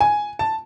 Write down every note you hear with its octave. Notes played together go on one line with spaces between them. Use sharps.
G#5
A5